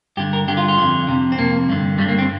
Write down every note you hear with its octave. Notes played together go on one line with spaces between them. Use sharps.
G2 D3 G4
A#4
G2 D3 G4
F4
F4
F2 D3
F2 C3
C4
F2 C3 A#3
G2 D3
G2 D3 G3
A#3
C4